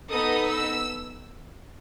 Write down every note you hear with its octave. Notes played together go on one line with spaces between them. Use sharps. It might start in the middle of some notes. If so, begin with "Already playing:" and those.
B3 D#4 A4 D#6
E6